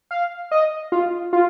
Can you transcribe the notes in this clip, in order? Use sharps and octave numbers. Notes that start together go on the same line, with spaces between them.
F5
D#5
F4
F4